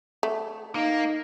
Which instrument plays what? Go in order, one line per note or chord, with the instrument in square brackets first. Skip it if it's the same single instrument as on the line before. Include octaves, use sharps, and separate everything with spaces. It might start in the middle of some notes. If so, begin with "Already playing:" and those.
[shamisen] A3
[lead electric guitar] A#3 [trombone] D#4